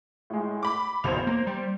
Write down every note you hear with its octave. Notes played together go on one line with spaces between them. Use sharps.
A2 G#3
B5 D6
F#1 B1 E2 C5 F7
A#3
G3